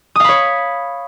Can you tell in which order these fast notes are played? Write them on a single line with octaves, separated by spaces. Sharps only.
D#6 F5 B5 C#5